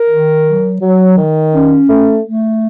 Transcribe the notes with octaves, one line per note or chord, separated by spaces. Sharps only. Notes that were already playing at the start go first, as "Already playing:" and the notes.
Already playing: A#4
D#3
F#3
F#3
D#3
C#4
A3
A3